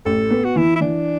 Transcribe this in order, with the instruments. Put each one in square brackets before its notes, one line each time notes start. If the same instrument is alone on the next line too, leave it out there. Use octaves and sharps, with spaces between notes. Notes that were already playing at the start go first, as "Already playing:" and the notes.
[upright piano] A1 [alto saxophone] A4
[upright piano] B3
[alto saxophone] F#4
[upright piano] E3 [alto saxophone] E4
[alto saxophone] E4
[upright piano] E3 [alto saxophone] D4